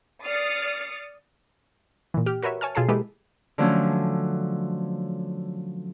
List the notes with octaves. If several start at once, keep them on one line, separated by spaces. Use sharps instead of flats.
D5 D#6 F6 A6 C7 C#7
A#2 E3
G4 F6
F#4 A#4 B4 C#5 E5
C#5 G#5 A5 F6
B2 F4 G#4 A4 A5 C7
E3 G#3 A#3 G4 A4 B4
D3 F3 F#3 A3 C#4